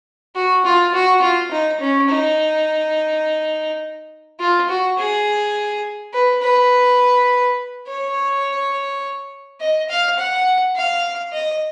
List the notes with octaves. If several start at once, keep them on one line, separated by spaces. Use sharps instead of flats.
F#4
F4
F#4
F4
D#4
C#4
D#4
F4
F#4
G#4
B4
B4
C#5
D#5
F5
F#5
F5
D#5